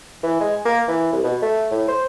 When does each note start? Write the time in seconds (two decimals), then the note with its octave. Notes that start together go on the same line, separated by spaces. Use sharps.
0.23 E3
0.40 G#3
0.65 A#3
0.88 E3
1.12 C2
1.24 B2
1.42 A3
1.71 A2
1.88 C5